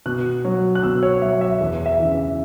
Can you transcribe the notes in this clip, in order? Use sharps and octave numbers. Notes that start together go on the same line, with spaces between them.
B2 F#6
F#3
F#6
B2 E6
C#5
F#3 E5
E5
E2
E5
C#3 E3
E5